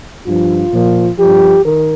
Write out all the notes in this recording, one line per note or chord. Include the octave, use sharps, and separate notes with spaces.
G2 F3 F4
A#2 F3
G2 F3 G4
D#3 A#4